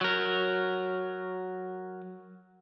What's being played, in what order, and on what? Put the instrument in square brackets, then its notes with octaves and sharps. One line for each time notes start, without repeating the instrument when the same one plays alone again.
[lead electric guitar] F#3 A#4